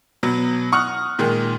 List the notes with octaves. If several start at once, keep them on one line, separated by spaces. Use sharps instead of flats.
B2 F#3 B3
F#5 C#6 D#6 F6 F#6
A#2 D#3 G#3